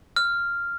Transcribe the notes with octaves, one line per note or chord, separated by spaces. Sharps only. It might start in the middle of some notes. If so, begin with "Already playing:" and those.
F6